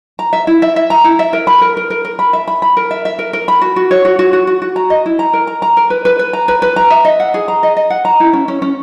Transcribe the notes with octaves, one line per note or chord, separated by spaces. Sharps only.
A#5
E5
E4
E5
E5
A#5
E4
E5
A#4
B5
A#4
A#4
A#4
A#4
B5
E5
B5
B5
A#4
E5
E5
A#4
A#4
B5
F#4
F#4
C#5
F#4
F#4
F#4
F#4
F#4
A#5
D#5
E4
A#5
A#4
A#5
A#5
A#4
B4
B4
B4
A#5
B4
B4
A#5
E5
D#5
F#5
G#4
A#5
D#5
D#5
F#5
A#5
E4
C#4
C#4
C#4